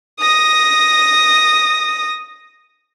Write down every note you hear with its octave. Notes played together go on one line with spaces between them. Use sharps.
D#6 A#6